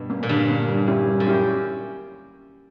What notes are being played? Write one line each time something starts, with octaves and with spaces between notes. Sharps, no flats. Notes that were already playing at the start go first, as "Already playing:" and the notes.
Already playing: G2 B2
A#3 C#4
A#2
G2 D3
A#3 C#4
G3
C#4 E4 G4
G3
F#2
C#4 E4 G4